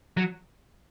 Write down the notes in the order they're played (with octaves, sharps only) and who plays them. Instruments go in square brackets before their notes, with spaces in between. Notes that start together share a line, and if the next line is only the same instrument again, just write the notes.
[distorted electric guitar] F#3